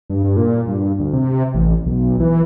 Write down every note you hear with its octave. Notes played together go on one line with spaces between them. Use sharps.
G2
G2
A#2
G2
D2
C3
A1
B1
E3